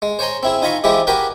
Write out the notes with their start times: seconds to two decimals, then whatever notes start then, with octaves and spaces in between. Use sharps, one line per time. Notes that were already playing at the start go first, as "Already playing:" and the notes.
0.02 G#3
0.19 C5 C#5 G#5 A#5 C6
0.43 C4 E4 G#4
0.62 D#4 F4 G#5 A#5 B5 C#6
0.84 E3 F3 G#3 E4 G4 G#4
1.07 F#4 G4 A#4 B4 G5 G#5